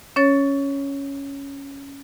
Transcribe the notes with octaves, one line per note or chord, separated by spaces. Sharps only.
C#4 C#5 A6